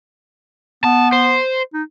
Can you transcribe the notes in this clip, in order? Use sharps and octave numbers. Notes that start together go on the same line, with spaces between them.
B3 A5
C5
D#4